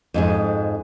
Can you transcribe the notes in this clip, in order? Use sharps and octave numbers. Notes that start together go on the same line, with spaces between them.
F2 G#2 G#4